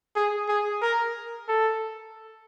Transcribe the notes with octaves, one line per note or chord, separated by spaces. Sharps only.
G#4
G#4
A#4
A4